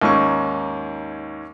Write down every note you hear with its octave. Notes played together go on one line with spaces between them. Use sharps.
D#2 G#2 C#4 C#6